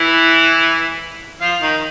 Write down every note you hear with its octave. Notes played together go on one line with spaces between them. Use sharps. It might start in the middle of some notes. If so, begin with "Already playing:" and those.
Already playing: E3 E4
F3 F4
D#3 D#4